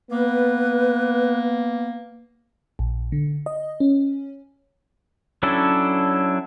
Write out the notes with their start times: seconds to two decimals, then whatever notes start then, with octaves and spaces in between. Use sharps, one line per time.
0.11 A#3 B3 B4
2.79 A#1
3.12 D3
3.46 D#5
3.80 C#4
5.43 F#3 C#4 D4 E4 A4